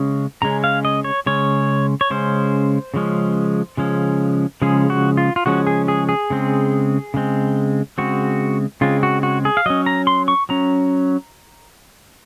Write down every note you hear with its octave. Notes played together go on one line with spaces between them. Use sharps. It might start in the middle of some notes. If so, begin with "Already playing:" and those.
Already playing: C#3 G#3 C#4
C#3 G#3 C#4 A#5
F5
D#5
C#5
C#3 G#3 C#4 C#5
C#5
C#3 G#3 C#4 C5
C#3 F3 G#3 C#4
C#3 F3 G#3 C#4
C#3 F3 G#3 C#4 G#4
F#4
F4
F4
C#3 F3 G#3 C#4 F#4
G#4
G#4
G#4
C#3 G#3 C4
C#3 G#3 C4
C#3 G#3 C4 F#4
C#3 G#3 C4 F4
F#4
F#4
G#4
F5
F#3 C#4 D#5
A#5
C6
C#6
F#3 C#4 A#5